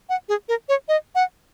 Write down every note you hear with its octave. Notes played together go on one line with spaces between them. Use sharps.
F#5
G#4
A#4
C#5
D#5
F#5